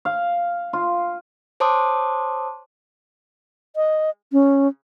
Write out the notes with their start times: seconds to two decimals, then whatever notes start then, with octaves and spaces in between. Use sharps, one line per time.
0.05 F5
0.73 F4
1.60 C5 C#5 A5 C6 D6 D#6
3.76 D#5
4.32 C#4